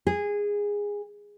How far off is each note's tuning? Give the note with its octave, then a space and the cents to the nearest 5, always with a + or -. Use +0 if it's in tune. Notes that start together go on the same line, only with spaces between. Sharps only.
G#4 -15